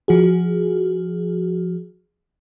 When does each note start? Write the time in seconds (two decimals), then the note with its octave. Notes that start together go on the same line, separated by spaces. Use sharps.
0.08 F3 F#4 G#4